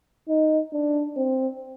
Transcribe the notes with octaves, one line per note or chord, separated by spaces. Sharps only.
D#4
D4
C4